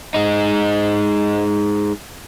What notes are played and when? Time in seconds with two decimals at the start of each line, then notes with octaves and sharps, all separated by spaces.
0.14 G#3 D#4